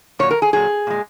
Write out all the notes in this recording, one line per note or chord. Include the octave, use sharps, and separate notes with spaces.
A#2 F#3 C#5
A#4
G#4
A#2 F#3 G#4
A#2 G#3